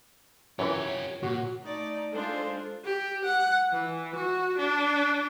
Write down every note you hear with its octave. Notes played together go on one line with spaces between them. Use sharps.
F#2 E3 F4 G4 C#5
A#2 F#4
A3 D#4 D5
G#3 D4 F4 A4 C5
G4
F#5
E3
F#4
D4